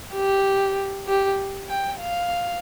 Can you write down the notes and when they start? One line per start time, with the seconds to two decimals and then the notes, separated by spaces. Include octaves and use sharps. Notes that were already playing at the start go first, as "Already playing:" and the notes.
0.14 G4
1.07 G4
1.68 G5
2.00 F5